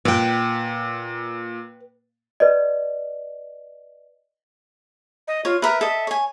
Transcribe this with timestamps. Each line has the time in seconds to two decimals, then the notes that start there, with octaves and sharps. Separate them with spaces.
0.05 A#2 B4 G5
2.40 B4 D5 D#5
5.28 D#5
5.45 F4 C#5
5.62 A#4 B4 E5
5.81 A4 D#5
6.07 C#5 G#5